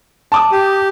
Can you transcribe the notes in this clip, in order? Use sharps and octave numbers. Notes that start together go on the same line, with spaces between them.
A5 D6 D#6
G4